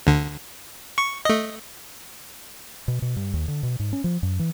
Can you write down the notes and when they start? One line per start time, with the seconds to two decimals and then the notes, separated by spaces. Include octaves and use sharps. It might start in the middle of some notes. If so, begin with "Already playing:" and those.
0.07 D2 D3
0.98 C#6
1.25 A3 D#5
2.88 B2
3.02 B2
3.16 G2
3.33 D#2
3.48 D3
3.63 B2
3.79 G#2
3.93 C#4
4.04 F3
4.23 F#2
4.39 E3